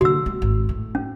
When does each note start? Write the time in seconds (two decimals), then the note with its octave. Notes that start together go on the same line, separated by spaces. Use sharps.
0.01 D3 A#3 F#4 E6
0.26 G#3 C4
0.42 G#1
0.69 A2
0.95 C#4